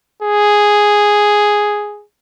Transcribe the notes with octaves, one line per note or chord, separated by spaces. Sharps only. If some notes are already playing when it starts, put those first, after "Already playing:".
G#4